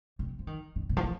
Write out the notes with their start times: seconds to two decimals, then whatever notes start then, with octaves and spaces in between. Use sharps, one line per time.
0.19 C3
0.39 F3
0.47 D#3
0.76 D#3
0.89 C3
0.97 F3
1.04 D#3